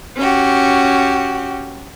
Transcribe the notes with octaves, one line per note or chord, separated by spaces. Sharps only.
C#4 F#4 G4